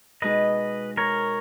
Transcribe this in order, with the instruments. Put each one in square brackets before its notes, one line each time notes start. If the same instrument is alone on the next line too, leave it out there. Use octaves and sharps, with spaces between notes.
[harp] B2 G#3 D#4 G#4 [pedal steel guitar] B4 D#5
[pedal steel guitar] A#4 C#5